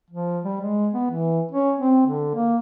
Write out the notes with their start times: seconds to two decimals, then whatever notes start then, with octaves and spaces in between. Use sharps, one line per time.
0.11 F3
0.44 G3
0.60 G#3
0.93 B3
1.11 E3
1.51 C#4
1.79 C4
2.06 D3
2.35 A#3